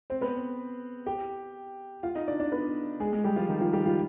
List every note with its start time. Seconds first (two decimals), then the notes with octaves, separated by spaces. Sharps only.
0.10 C4 C5
0.21 B3 B4
1.06 G4 G5
2.03 F4 F5
2.15 D#4 D#5
2.28 D4 D5
2.40 D4 D5
2.52 B3 B4
3.00 G#3 G#4
3.13 G#3 G#4
3.24 G3 G4
3.36 F3 F4
3.49 D#3 D#4
3.61 F3 F4
3.73 G3 G4
3.86 F3 F4